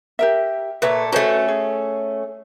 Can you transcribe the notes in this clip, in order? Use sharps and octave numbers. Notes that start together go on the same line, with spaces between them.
G4 A#4 E5
A#2 A3 B4 C#5 E5
A3 C#4 F#4 B4 C5
G#4